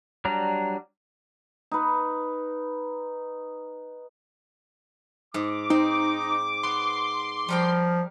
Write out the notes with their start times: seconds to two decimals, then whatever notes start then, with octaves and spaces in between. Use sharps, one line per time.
0.25 F#3 G3 D4 A#5
1.71 D#4 B4
5.34 G#2 D6
5.70 C4 D#4
6.63 B3 C6
7.49 F3 G3 A#4 G5